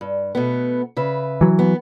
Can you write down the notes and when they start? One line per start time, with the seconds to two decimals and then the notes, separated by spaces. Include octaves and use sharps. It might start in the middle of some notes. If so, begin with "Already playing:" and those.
0.01 G2
0.35 B2 A3 B3
0.97 C#3 B4 E5
1.41 E3 F#3
1.59 B3